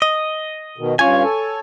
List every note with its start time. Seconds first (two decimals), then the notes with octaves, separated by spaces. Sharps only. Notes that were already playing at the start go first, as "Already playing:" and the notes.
0.02 D#5
0.78 B2 D#3
0.99 G2 C#4 F4 C#5 G#5
1.23 A4